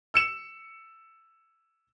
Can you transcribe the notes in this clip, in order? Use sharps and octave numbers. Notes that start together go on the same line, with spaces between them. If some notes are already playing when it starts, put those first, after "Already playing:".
E6 C#7 E7